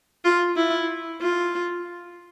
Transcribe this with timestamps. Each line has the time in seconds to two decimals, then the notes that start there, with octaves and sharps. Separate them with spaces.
0.25 F4
0.57 E4
1.21 F4